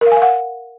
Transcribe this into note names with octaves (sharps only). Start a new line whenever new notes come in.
A#4
F5
G#5
F5
F#5